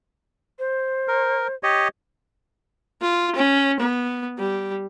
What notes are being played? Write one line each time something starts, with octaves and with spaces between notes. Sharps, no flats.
C5
A#4
G4 C#5 D#5
F4
C#4
B3
G3